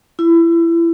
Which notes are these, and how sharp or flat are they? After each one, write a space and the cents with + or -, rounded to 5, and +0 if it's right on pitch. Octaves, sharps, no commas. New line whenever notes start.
E4 +25